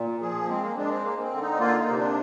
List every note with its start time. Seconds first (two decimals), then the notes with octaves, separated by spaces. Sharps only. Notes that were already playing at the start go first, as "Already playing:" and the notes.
Already playing: A#2
0.21 F3 G#4
0.45 A#3
0.49 G#3 C4
0.63 A#3
0.77 G#3 D4
0.91 C4
1.04 A#3
1.18 A#3
1.23 C4
1.32 D3
1.42 D#4
1.60 A#3 F4
1.78 D#4
1.88 C3
1.97 D4